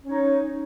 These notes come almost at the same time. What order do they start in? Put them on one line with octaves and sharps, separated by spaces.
C#4 C#5 D#4